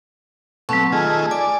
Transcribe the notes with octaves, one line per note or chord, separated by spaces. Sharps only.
B2 F#3 A3 C4 C#6
D#3 A3 F4 G#4
D5 G#5